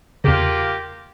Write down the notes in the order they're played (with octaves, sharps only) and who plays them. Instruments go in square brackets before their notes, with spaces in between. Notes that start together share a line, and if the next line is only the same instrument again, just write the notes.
[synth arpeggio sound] E2 C#3 [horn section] A#3 F4 G4